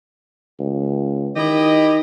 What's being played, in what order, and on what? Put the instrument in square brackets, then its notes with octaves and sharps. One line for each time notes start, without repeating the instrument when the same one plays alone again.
[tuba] C#2
[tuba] D#3 [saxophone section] E4 G4 D#5